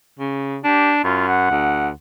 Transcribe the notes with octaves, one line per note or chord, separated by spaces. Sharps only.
C#3
D4 G4
F#2 F4
F#5
D2